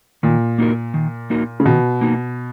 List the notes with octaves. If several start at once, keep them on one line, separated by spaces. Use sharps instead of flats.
A#2 D#3
A#3 D#4 F#4 A#4
D#3
A#3 D#4 F#4 A#4
C#3
B2 D#3
A#3 D#4 F#4